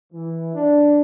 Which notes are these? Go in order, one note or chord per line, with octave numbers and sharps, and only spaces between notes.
E3
D4